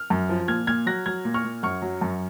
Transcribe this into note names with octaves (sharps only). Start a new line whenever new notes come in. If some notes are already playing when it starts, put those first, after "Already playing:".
Already playing: F6
F#2
F3
A#2 F6 G#6
A#2 F6 G#6
F#3 F#6 A#6
F#3 F6 G#6
A#2
C#6 F6
A#2
F#2 C#6 F6
F#3
F#2